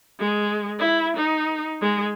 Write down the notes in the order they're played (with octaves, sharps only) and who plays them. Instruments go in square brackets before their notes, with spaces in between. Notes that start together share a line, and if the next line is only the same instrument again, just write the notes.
[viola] G#3
E4
D#4
G#3